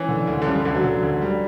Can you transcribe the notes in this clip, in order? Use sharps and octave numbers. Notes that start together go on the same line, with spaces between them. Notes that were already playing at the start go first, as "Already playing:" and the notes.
Already playing: E3 C#4
D3
D2
D3
C#3 G3
D3
D2 D3
F#3
D3
D2
G3